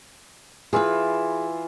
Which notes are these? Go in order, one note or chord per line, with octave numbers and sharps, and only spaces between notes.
E3 F4 G#4 B4 E5